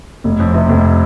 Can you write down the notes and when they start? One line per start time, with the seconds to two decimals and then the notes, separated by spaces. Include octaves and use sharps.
0.24 F1
0.40 F2
0.54 C3
0.69 F1